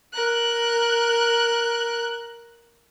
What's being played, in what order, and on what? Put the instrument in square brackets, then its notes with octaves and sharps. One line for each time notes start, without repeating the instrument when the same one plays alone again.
[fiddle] A#4 F#6